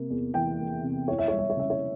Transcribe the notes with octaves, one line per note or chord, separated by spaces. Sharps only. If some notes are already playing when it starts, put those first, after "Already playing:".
Already playing: C3 A#3
E2
E3 G5
A#3
C3
E4 C#5
E5
C#5
G3
E5
C#5
C#3 E5
C#5